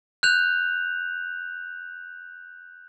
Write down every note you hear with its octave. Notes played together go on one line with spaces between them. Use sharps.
F#6 G6 F7